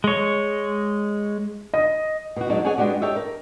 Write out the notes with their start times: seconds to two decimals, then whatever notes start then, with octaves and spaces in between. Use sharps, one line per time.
0.04 G#3 C#5
1.74 D#5
2.36 B2 F#4
2.50 F#3 G#3 D4 D#4
2.65 G#4 A4 C#5 D#5 F#5 G#5
2.78 G#3 B3 D4 F#4 G4
3.02 G4 A4 C#5 D#5 E5
3.16 A#4